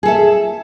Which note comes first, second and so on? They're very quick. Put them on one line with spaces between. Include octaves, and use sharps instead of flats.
G#4 A4 E5